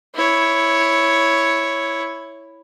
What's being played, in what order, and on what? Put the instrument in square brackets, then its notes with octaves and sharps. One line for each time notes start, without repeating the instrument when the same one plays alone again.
[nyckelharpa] E4 C#5